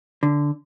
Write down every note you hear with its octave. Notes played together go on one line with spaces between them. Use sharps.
D3